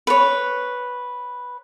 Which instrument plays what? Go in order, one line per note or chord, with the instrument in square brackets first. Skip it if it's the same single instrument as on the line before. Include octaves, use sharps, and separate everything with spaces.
[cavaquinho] B4 C#5